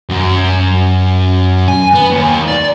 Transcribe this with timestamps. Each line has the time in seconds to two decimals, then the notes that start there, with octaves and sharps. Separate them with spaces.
0.10 F#2
1.68 G#5
1.94 B3
2.11 D#2
2.48 D5